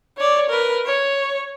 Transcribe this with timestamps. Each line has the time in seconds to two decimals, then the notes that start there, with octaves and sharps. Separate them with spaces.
0.17 C#5 D5
0.50 A#4 B4
0.86 C#5